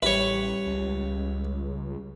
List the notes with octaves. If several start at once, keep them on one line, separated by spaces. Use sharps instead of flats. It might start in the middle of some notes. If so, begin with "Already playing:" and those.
A1 G3 G4 B4 C#5 E5
C#2